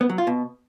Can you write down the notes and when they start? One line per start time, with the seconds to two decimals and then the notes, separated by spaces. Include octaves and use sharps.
0.01 B3
0.09 F#3
0.18 F4
0.27 B2